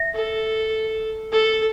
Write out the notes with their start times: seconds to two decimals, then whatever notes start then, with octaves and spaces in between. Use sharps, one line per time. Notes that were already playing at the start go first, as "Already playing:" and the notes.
Already playing: E5
0.14 A4
1.32 A4